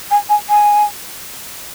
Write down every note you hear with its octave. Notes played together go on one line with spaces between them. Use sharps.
G#5
G#5
G#5